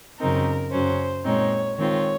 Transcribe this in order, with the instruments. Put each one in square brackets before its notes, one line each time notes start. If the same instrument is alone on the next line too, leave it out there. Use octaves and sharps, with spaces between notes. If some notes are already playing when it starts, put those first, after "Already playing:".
[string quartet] F#2 C#3 F#3 C4 D#4 A#4
F#2 C#3 F#3 C#4 C5
A#2 G#3 C4 D#4 C#5
D#3 G#3 C4 F4 C#5